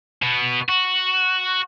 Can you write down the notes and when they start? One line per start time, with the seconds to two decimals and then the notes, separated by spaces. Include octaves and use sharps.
0.22 B2 B3
0.69 F#4